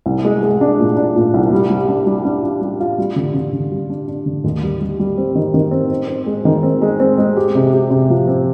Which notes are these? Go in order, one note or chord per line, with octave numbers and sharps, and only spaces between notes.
C2
G#3
G#3
D4
A#2
D4
A#2
C2
G3
G3
D4
G3
D4
F4
G3
F4
G3
D3
D3
D3
G3
D4
D4
D3
D#2
G3
G3
G3
C4
D#3
D#3
C4
C4
C4
G#3
D#3
C4
G#3
C4
G#3
G4
C3
G4
C3
F3
C4